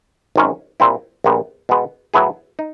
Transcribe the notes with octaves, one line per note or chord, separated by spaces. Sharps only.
G#1 F#2 D#3 G#3 C#4
A#2 G3 C4 E4
A#1 A#2 G3 B3
B2 G#3 B3
A2 F#3 B3 E4 G#4
D#4